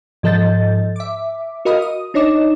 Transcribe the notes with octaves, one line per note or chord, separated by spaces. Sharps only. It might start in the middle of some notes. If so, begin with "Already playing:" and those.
G#2 F3 A4 D#5 G6 A6
E5 D6
F#4 A#4 D#5 F5 B5 D#6
D#6
D4 D#4 C#5 D#5 D6 E7